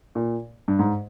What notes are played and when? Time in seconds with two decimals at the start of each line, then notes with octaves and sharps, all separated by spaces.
0.15 A#2
0.68 G2
0.79 G#2